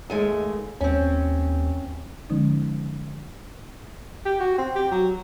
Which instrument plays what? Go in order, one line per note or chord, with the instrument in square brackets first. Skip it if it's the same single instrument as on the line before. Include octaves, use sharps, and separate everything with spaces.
[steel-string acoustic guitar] D#2 G#3 A3
[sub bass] D#2 [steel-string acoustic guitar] C4 C#4
[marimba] D3 F3 G#3 C#4 D#4
[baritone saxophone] G4
F#4
C4
G4
F#3